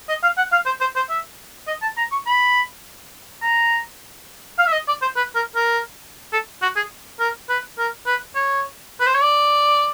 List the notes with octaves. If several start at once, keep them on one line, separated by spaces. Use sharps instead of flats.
D#5
F5
F#5
F5
C5
C5
C5
E5
D#5
A5
A#5
C#6
B5
A#5
F5
E5
D#5
D5
C5
B4
A#4
A#4
A4
F#4
G#4
A#4
B4
A#4
B4
C#5
B4
C5
C#5
D5